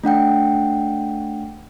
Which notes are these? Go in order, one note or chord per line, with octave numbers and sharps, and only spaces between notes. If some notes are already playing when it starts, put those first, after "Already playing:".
A3 D4 F#5 G5